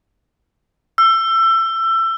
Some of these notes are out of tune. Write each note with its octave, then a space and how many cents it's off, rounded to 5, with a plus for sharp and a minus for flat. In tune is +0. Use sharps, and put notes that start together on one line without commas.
E6 +25